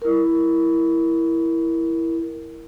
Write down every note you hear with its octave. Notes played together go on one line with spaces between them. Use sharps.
E4 A#4